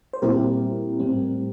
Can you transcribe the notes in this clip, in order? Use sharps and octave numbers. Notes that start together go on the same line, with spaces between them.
C5
A#2 G3 C4 E4 G4 A#4
A2 G3 C4